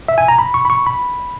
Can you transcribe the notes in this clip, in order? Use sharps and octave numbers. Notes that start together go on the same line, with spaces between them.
E5
G#5
A#5
B5
C#6
B5
C#6
B5